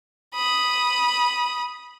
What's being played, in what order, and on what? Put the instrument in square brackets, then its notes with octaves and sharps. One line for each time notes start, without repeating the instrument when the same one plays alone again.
[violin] B5 D#6